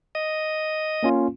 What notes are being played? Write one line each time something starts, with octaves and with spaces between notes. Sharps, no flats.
D#5
A#3 C#4 F4